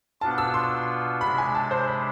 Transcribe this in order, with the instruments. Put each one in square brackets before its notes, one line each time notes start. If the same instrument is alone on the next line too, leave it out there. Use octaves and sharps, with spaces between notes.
[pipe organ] B2 B3 D4 F4 [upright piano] A5
[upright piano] E6
C6
[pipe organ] C3 G#3 D4 [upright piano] B5
[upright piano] G#5
A5
C5
B5